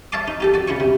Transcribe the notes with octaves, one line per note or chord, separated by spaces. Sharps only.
C#5 E5 F5 A5 C6 D6
D#4
F4 G4 A4
F#4 D5
C#3 E4 C#5 C#6
C3